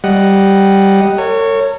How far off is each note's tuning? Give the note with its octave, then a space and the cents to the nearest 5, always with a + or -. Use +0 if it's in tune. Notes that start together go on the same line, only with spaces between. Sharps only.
G3 -5 D#5 +0 F#5 +0
A#4 -45 C#5 +0